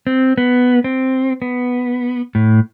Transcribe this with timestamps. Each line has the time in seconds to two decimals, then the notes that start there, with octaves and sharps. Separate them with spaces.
0.07 C4
0.38 B3
0.84 C4
1.42 B3
2.35 A2